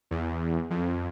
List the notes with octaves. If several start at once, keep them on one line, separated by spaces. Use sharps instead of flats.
E2
F2